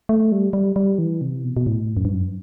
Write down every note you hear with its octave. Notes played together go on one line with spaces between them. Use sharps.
A3
G3
G3
G3
E3
C3
B2
B2
A2
F#2
G2
F#2